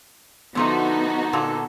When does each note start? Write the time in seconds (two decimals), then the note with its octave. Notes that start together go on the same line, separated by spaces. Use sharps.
0.55 D3 F3 A3 B3 D#4 F#4
1.33 A#2 D3 A4